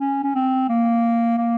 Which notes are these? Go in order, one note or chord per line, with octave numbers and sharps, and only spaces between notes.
C#4
C#4
C4
A#3
A#3